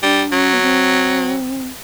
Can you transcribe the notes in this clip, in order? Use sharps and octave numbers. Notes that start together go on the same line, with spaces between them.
G3 D4
F#3 C#4
B3
C4